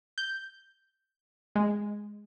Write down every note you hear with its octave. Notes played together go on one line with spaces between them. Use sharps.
G6
G#3